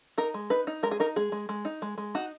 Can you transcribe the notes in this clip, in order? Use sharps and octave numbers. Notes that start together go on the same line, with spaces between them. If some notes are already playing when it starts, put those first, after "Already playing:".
D#4 A#4
G#3
D#4 B4
D#4
G#3 A#4
G#4
D#4 A#4
G#3 G#4
G#3
G#3
D#4
G#3
G#3
D#4 F#4